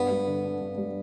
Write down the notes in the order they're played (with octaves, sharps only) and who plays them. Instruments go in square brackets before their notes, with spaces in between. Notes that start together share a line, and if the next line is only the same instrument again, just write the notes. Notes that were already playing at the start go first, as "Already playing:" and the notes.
Already playing: [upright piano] G2 [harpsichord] B3
[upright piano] G3
D3
D4
G2
G3